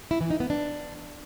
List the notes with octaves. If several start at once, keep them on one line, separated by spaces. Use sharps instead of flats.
E4
E3
D#4
B3
D4